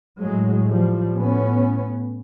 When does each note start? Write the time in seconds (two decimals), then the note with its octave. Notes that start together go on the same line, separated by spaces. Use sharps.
0.21 A2 F#3 G#3
0.69 F3 G3
1.16 A2 B3 C#4